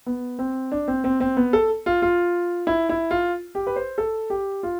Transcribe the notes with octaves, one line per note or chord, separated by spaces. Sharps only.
B3
C4
D4
C4
C4
C4
B3
A4
F4
F4
E4
E4
F4
G4
B4
C5
A4
G4
F4